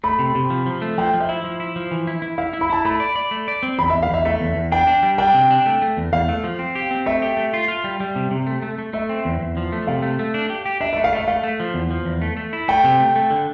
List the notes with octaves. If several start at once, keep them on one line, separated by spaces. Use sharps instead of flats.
A3 B5
C3
C3
F3
F3
A3
F3 G5
F3
E5
E4
F3
E4
F3
E3
E4
E4
E4 F5
E4
B5
E4 A5
A3 B5
D5
D5
A3
D5
C4
E2 B5
E5
E2
F5
E2 E5
A3 E5
E2
E2
D4 G5
D4
G3
D4 G5
C3
D4
A3
A3
E2
E2 F5
A3
F3
C4
G4
C4
A3 E5
G4
A3
F4
F4
G3
G3
C3
C3
A3
A3
A3
A3 E5
C4
E2
E2
F3
A3
C3 F5
A3
A3
D4
G4
G4
D4 E5
E5
A3
F5
A3 E5
A3 F5
A3
F3
E2
F3
E2
A3
A3
E4
A3 G5
C3
A3
A3
D3